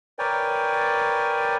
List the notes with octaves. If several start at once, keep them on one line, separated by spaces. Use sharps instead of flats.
A#4 B4 C#5 D5 G5 G#5